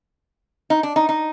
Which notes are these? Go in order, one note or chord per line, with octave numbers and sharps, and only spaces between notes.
D#4
D4
D#4
D#4